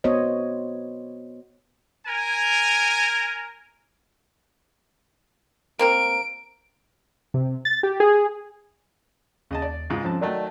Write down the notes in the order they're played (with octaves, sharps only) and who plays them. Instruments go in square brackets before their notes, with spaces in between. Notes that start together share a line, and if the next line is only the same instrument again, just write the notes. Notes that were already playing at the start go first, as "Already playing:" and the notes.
[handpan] B3 F#4 C5 C#5 D#5
[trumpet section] A#4 G#5
[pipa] A#3 C4 A#4 [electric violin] D7
[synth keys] C3
A6
G4
G#4
[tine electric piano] D#2 A6 [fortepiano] C#3 D#5 A5
[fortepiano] D5
C#2 G#2 F4
[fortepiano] F2 A5 [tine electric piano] F3 C#4
[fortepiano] D#3 F#3 A3 [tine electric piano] D5 D#5 A5